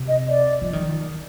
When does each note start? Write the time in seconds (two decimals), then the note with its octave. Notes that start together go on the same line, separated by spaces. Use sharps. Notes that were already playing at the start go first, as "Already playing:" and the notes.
Already playing: C3
0.08 D#5
0.29 D5
0.62 F3
0.73 D#3